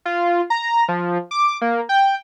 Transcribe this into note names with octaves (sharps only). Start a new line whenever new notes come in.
F4
A#5
F3
D6
A#3
G5